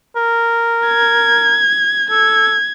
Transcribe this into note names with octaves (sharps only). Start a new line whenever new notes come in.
A#4
G#6
A4 G#6